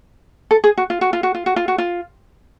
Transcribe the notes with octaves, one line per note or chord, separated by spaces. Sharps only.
A4
G#4
F#4
F4
F#4
F4
F#4
F4
F#4
F4
F#4
F4